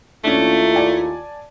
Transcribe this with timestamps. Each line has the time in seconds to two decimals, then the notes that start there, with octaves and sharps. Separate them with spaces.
0.24 D#2 A3 C#4 D4 E4 F4
0.75 D5 G#5 A5